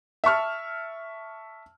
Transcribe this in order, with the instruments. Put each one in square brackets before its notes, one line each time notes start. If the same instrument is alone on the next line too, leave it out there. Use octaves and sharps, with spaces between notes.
[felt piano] E5 A5 C#6 F6